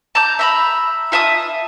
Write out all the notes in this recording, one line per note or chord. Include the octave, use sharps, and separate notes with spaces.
A5 A#5 D6 G6
E5 A#5 B5
F4 E5 A5 D#6